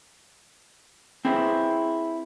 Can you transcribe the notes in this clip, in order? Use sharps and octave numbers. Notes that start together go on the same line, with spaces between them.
C4 E4 G#4 B4 C5